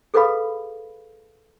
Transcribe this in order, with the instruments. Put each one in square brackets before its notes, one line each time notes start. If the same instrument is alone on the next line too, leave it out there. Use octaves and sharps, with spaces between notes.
[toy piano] G#4 A4 B4 D#5 F5 B5